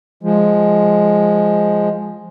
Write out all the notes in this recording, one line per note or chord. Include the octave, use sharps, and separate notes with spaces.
F3 G#3